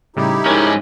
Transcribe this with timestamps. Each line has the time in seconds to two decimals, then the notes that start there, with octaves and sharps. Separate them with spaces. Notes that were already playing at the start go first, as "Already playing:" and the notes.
0.16 A2 C#3 G3 D#4 E4 G4
0.46 G#2 C#4 A#4